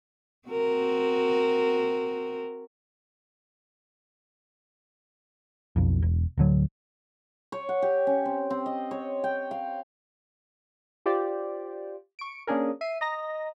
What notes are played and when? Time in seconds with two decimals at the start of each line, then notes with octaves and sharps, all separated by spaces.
0.48 C4 F#4 A#4
5.76 B1 F2
6.02 E1
6.37 D1 D3 F#3
7.52 C#5
7.69 F#5
7.82 G4
8.07 C#4
8.25 C4
8.50 C4
8.66 D#5
8.91 C#5
9.24 G5
9.51 F5
11.06 F4 G4 C5 D5
12.19 C#6 D7
12.47 A#3 C#4 D4 G#4 A#4
12.81 E5 C7 D#7
13.01 D#5 A#5 A#6